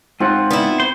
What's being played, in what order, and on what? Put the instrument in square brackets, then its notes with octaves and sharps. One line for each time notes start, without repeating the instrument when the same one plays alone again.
[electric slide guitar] G#2 F4 F#5 [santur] C4
[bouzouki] B3 E4
[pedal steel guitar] C5